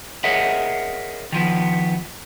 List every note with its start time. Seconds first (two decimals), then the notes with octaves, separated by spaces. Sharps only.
0.24 G#4 A#4 C#5 D#5 E5 F#5
1.32 D#3 F3 B3